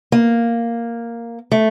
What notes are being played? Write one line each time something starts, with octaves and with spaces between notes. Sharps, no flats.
A#3
A3